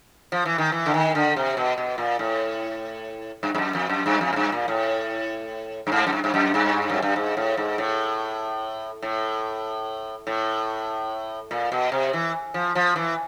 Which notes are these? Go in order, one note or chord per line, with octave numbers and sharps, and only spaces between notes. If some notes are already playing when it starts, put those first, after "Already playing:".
F3
E3
D#3
E3
D3
D#3
D3
C3
B2
B2
A#2
A2
G2
G2
F#2
F2
F#2
G2
F2
G#2
G2
A#2
A2
G2
G#2
F#2
G2
G2
F#2
G2
F#2
G2
G#2
A2
G#2
A2
A2
A2
A#2
B2
C3
E3
F3
F3
E3